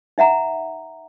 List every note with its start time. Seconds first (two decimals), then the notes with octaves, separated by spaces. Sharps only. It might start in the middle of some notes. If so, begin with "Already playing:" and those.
0.18 D#4 E5 F#5 A#5